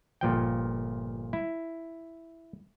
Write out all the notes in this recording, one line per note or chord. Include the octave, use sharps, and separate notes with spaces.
G1 A#2 F3 G5
E4